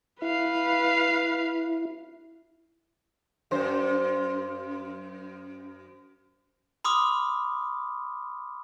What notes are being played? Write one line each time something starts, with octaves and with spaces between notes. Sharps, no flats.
E4 B4 F5
F#2 C5
B5 C6 D6 D#6 F6